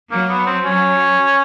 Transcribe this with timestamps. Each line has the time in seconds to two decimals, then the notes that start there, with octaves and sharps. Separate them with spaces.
0.11 F#3 A#3
0.30 B3
0.47 C4
0.65 F#3 C#4